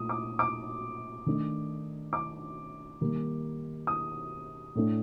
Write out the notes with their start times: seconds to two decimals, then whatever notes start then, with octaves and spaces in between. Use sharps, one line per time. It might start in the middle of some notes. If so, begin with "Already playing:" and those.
Already playing: A#2 A3 D#6
0.09 D6
0.39 D6
1.26 D#3 A3 D4
2.13 D6
3.01 D#3 G3 A#3
3.87 D#6
4.75 A2 A3 D4